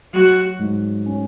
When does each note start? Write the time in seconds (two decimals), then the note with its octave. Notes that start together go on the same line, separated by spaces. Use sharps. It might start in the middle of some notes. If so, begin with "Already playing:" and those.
0.13 F#3 F#4
0.59 G#2
1.06 C#4